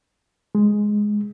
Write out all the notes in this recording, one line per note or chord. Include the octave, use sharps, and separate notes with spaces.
G#3